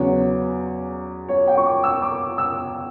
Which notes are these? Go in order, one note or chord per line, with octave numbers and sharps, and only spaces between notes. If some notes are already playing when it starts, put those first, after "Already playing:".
Already playing: E2 C#3 F#3 B3 C#5
C#5
G5
C#6
D6
E6
D6
E6